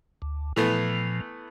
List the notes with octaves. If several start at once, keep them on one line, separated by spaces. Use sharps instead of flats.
D2
A#2 E3 F3 A3 B3